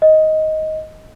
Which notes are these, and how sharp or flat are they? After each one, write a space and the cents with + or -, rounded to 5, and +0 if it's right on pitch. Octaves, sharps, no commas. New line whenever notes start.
D#5 +10